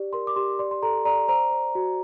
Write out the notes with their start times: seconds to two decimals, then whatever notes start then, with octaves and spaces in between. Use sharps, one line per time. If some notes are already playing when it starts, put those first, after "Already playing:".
Already playing: G4 D5
0.13 A#4 C6
0.27 D6
0.36 G4 C6
0.59 D5 C6
0.71 C6
0.82 A4 A#5
1.05 D5 A#5
1.28 C5 A#5
1.51 C5
1.75 F#4